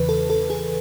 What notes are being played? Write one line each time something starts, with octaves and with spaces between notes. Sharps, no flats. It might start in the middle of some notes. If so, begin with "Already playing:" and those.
Already playing: E2 C#3 E3 B4
A4
A4
G#4